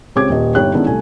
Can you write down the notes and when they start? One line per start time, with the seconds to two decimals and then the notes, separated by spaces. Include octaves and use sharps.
0.15 C#2 C4 G4 C#5 D6 G#6
0.29 D#1 G3 D#5
0.55 G1 D#4 G4 C#5 G5 F#6
0.74 D#3 G#3 B3 C#4 D4 E4
0.87 C2 A3 G#5